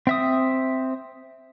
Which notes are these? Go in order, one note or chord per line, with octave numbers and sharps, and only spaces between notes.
C4 E5 D#6